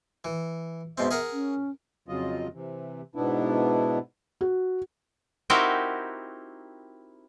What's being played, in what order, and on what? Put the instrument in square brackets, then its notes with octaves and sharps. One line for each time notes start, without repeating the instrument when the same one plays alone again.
[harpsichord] E3
[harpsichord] G#2 B2 C4 [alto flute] E5
[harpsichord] G#4 A#4 F#5
[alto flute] C#4
[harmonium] F2 C#3 F#3 F4 D#5
C3 E3
G#2 B2 B3 D4 E4
[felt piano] F#4
[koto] C4 D#4 E4 F#4 G4 A#4